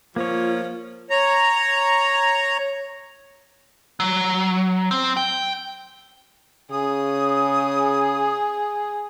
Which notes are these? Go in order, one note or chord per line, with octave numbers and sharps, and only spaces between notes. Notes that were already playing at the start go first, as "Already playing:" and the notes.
F3 A#3 F4 C#5
C#5 A#5
F#3
C4
G5
C#3 G#4 D#6